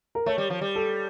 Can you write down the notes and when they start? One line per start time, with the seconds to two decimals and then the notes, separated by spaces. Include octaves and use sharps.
0.15 A#4
0.26 A3 C#5
0.38 G3
0.50 F3
0.61 G3
0.75 A4